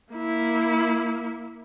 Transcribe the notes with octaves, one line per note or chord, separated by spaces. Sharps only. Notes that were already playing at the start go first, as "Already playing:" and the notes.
A#3 E4